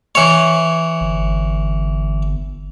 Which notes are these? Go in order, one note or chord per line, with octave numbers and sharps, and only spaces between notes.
E3 C#5
G1